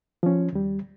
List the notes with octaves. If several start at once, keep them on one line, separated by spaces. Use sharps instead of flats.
F3 C#4
D#2 G3